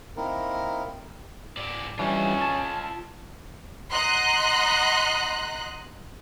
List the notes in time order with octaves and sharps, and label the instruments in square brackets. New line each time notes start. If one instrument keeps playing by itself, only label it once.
[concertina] A#3 C4 D#4 E4 A#4
[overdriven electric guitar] G#2 D5
[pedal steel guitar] E3 G3 D4 [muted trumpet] C#4 [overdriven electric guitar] F4 D#5
[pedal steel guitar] A5
[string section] D#5 F#5 A#5 C6 F#6